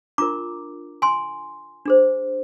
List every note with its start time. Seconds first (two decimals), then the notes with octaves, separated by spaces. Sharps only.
0.18 D4 F4 A#4 A#5 D6
1.02 G#5 C6
1.86 D4 G#4 C5